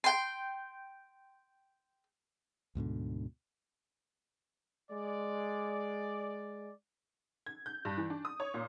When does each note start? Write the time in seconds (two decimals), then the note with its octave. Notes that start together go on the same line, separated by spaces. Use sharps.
0.04 G5 C6
2.75 D2 G#2 B2 D3
4.91 G#3 D5
7.46 G#6
7.66 G6
7.85 G2
7.98 E3
8.10 D4
8.25 D#6
8.40 C#5
8.54 A#2